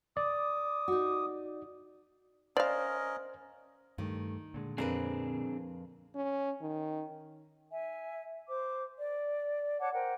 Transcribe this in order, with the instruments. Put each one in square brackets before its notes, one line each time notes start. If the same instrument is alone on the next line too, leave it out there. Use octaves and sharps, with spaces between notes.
[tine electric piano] D5 [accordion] D6 D#6
[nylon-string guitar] D#4 F#4
[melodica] C#4 A#4 D#5 [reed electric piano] C5 [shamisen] D5 F5
[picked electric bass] G2 G3 A3 [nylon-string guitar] D#3
[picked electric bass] A#2 D3 G#3
[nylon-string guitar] F2 A#4 B4 [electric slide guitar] C4 D4 G#4
[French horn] C#4
D#3
[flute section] E5 G#5
C5 D6
D5
C#5 F#5 A5 D6
A#4 C5 F#5 G5